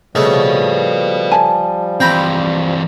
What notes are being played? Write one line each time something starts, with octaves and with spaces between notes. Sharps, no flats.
C#3 F3 G3 A3 B4 D#5
G#5 A5
E3 C4 G5 A#5 B5